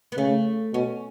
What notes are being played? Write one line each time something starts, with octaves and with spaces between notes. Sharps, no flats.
B3
C#3 A3
B2 C#4